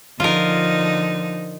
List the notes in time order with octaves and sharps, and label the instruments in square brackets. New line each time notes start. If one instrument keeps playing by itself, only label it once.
[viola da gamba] D3 D#4 [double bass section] F3 [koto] F4 A#4